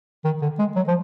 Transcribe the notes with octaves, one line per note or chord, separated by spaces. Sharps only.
D#3
D3
G#3
F#3
F3